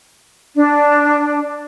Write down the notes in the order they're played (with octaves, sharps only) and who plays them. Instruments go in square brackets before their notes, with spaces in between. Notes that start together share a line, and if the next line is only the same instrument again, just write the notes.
[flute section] D4